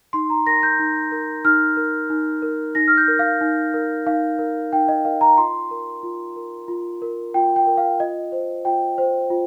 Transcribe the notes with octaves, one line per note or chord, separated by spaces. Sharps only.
D#4 C6
A#5
A#4 A#6
G6
D#4
A#4
D#4 F6
A#4
D#4
A#4
D#4 A#6
F6
G6
A#4
F5
D#4
A#4
D#4 F5
A#4
D#4 G5
D#5
A#4 F5
A#5
F4 C6
A#4
F4
A#4
F4
A#4
F4 G5
G5
A#4
F5
F4 D#5
C5
F4 G5
C5
F4